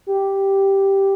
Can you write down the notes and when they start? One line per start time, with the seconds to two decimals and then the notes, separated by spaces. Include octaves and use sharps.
0.07 G4